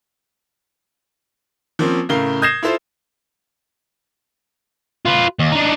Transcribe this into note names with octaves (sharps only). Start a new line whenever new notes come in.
F3 A#3 C4 C#4
A2 C#3 A#4 F5 G7
D#6 G6 G#6 A#6 C7 E7
E4 F4 A4 C5
F4 B4
D#2
D4 D#4